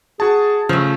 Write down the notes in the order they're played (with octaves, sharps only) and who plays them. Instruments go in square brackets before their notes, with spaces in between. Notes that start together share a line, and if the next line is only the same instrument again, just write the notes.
[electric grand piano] F#4 A5 [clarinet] G#4
[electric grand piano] C#3 [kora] F3 A3